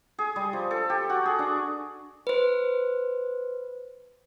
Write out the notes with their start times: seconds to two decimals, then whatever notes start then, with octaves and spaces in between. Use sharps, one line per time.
0.19 G#4
0.36 G3
0.53 F3
0.71 A4
0.90 G4
1.10 F#4
1.25 G#4
1.39 D4
2.27 B4 C5